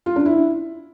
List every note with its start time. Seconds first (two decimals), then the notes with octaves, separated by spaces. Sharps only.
0.06 F4
0.16 D4
0.25 E4